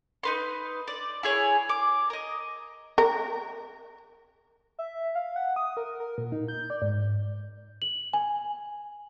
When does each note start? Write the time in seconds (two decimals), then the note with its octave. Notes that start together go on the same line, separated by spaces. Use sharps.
0.23 D#4 B4 C6
0.88 D5
1.23 E4 G#4 C#5
1.69 D6
2.10 A#4 D#5
2.98 A#4
4.79 E5
5.15 F5
5.36 F#5
5.56 D#6
5.77 A#4
6.00 A#4
6.18 A#2
6.32 D#4
6.48 G6
6.70 D5
6.82 G#2
7.82 F#7
8.13 G#5